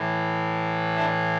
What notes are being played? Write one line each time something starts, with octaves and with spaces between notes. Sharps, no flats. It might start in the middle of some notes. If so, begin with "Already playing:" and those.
Already playing: A2 E3
D4 E4